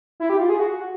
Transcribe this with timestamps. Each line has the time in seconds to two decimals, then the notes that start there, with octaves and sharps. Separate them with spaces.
0.20 E4
0.30 G4
0.39 F4
0.49 G#4
0.59 F#4